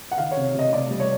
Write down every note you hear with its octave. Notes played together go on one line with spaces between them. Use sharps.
F#5
D#3 F5
C#5
C3
C3 D#5
C3 D5
G3
C#5